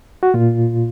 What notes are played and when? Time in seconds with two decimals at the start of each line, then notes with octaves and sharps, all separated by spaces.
0.23 F#4
0.34 A#2 F4